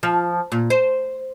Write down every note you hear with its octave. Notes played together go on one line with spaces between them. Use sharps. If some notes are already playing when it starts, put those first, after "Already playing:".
F3
A#2
C5